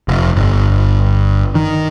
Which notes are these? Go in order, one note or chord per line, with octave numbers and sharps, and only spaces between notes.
F1
G1
D#3